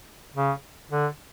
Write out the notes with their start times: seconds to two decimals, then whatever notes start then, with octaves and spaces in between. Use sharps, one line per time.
0.35 C#3
0.90 D3